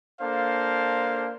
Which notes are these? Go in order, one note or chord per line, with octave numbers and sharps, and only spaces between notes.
A#3 D4 A4 C5 F5